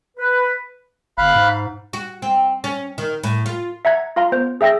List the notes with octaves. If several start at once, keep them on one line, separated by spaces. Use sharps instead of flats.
B4
G1 F5 B5 F#6
G#2
F#4
C4
C#4
D#3
A2
F4
E5 F#5 A#5 G#6
F4 F5 A#5 C6
B3 C5
G#4 E5 G5 E6 A#6